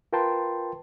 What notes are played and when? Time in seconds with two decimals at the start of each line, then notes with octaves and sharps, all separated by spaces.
0.13 F4 A#4 B4 G5 A5 C6